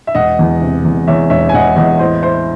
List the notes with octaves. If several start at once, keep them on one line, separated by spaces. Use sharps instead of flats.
E5
E1 D#5 F#5
E2
C3
E2
E2 C#5 E5
E1 C#5 E5
G#5
E1 D#5 F#5
E2 D#5 F#5
A2 C5 D#5
E4 C5